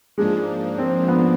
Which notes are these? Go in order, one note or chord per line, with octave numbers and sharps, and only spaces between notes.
G#2 F3 G#3 A#3 D4
C4
B3